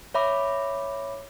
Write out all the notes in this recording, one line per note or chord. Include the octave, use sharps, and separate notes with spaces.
C#5 E5 B5 D6